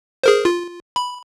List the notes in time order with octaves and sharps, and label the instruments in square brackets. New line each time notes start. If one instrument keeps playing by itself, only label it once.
[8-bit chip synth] G#4 A#4 C5
F4
B5